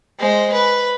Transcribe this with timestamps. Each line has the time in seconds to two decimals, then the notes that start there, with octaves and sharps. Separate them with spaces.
0.19 G#3 C5
0.53 B4